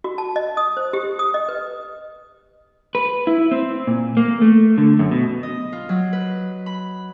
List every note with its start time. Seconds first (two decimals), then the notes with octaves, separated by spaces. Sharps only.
0.04 F#4
0.18 A5
0.36 D#5
0.57 D#6
0.77 C5
0.93 G4
1.19 D#6
1.34 D#5
1.49 B4
2.95 B4
3.27 E4
3.51 C4
3.87 A#2
4.17 A#3
4.42 A3
4.78 D3
4.99 F#2
5.11 B2
5.43 D#5
5.73 F4
5.89 F#3
6.13 B4
6.66 B5